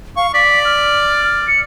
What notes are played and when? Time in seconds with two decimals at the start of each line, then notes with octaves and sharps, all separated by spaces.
0.16 F5 C#6
0.34 D5 B6
0.65 F6
1.48 C#7